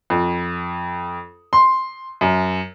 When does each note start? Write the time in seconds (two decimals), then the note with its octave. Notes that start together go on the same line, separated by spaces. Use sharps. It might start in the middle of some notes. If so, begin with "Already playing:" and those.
0.10 F2
1.53 C6
2.21 F#2